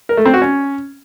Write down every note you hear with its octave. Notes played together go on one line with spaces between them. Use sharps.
A#4
A3
C4
F#4
C#4